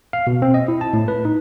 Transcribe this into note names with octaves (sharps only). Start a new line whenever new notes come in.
F5
B2
C4
D#5
E4
A5
A2
B4
D#4